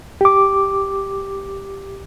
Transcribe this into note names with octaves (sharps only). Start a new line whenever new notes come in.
G4 D6